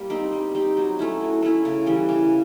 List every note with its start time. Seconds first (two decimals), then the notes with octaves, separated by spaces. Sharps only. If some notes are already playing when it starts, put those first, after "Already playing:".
Already playing: G3 A#3
0.10 C4 D#4 G4
0.32 G3
0.55 C4 D#4 G4
0.77 F#3
0.99 A3 C#4 E4
1.21 F#3
1.42 A3 C#4 E4
1.65 C#3
1.87 E3 G3
2.09 C#3